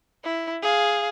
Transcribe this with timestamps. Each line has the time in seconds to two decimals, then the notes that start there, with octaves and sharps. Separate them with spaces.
0.24 E4
0.62 G#4 F5